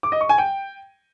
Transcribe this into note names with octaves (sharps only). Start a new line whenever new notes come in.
D6
D#5
C#6
G#5
G5